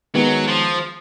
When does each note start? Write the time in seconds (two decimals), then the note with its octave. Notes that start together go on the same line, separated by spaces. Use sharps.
0.14 D#3 F#3 G#3 B3
0.48 F3